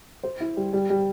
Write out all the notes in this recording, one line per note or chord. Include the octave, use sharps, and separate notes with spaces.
C5
E4
G3
G3
G3